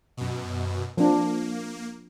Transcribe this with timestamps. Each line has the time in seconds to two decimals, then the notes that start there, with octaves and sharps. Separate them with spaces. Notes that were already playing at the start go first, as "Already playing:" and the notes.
0.17 F#2 B2
0.97 F3 A#3 D4